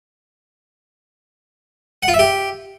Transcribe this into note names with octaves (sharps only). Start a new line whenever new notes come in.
F#5
F4
E5
G4